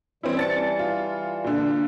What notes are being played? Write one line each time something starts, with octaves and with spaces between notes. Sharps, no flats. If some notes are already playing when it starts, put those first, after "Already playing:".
E3 G3 C4 C#4 E4
A5 A6 C#7
F4
A#2 D3